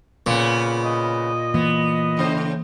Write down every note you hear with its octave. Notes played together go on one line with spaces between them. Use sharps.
A#2 C#3 B3
D#5
E3 A#3 B3
A2 C#3 C5